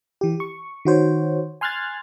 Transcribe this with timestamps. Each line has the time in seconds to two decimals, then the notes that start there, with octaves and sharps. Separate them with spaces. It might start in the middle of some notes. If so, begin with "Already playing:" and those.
0.21 E3 G4
0.40 C#6
0.85 D#3 F#4 C5 C#5
1.61 G#5 C6 F6 F#6 G#6 A6